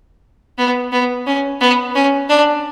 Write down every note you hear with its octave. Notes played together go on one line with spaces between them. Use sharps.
B3
B3
C#4
B3
C#4
D4